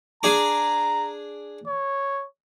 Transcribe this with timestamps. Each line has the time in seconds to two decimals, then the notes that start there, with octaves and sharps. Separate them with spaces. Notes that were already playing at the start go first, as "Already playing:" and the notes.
0.23 D4 G#4 A#5 D6
1.67 C#5